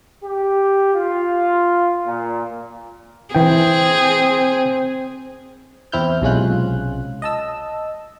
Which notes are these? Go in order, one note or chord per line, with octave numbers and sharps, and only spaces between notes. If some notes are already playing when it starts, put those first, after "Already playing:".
G4
F4
A#2
E3 C4 G#4 G5
E2 C4 E4 F6 G6
B1 C3 G#3 C#4 F4 F#6
D#5 A5 E6